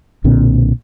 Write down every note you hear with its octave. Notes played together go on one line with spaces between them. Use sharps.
B1 A#2 D3 C4